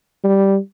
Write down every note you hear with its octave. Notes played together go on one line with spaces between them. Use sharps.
G3